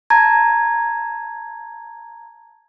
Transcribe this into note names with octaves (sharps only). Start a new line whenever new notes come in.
A5 A#5 G#6